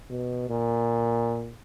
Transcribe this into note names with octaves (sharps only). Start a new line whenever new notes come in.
B2
A#2